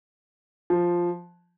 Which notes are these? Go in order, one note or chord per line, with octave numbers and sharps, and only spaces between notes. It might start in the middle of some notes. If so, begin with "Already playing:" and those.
F3